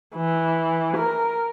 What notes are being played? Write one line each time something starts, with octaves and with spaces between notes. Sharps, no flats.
E3
A#4